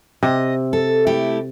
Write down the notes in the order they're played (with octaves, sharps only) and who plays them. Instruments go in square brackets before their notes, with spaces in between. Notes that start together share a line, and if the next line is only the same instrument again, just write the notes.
[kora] C3 [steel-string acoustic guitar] D#5
[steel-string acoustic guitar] A4
A3 E4 G4